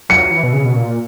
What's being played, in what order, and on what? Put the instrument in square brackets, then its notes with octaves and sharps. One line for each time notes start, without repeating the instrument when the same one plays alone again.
[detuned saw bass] F#3 [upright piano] C#7
[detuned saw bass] E3
B2
C#3
B2
A#2